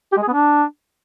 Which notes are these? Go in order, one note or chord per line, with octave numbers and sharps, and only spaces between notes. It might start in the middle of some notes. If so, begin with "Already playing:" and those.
G4
G#3
G#4
B3
D4